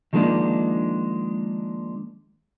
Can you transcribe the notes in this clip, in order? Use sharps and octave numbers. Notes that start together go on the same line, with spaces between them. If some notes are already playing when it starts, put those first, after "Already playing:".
D#3 F3 G#3 A#3 D4